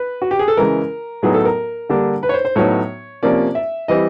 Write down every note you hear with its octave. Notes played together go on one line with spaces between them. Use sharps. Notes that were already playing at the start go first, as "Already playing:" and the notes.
Already playing: B4
F#4
G4
G#4
A4
C#3 E3 G#3 A#4
A2 F#3 B3 D#4 G#4
A4
A#4
D3 G3 A#3 D4
B4
C#5
C5
C5
A2 F#3 B3 D#4 C#5
C3 F3 A#3 C#4 D5
E5
E3 G3 C4 D#5